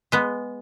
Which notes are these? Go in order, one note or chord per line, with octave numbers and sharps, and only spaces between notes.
G#3 B3